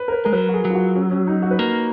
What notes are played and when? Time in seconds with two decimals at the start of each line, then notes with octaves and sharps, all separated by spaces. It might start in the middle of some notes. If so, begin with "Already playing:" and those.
Already playing: B4
0.08 A#4
0.12 B4
0.25 G#3 A#4
0.33 F#3 B4
0.49 F#4
0.54 G#4
0.65 F#3
0.70 F4
0.75 F#4
0.96 C#4
1.11 C#4
1.27 D#4
1.42 F#4
1.51 B4
1.58 A#3 A#4